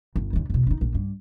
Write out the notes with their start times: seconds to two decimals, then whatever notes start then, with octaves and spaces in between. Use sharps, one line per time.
0.16 G1
0.33 E2 D3
0.50 E2 B2
0.67 D4 D#4
0.81 A#1
0.95 G2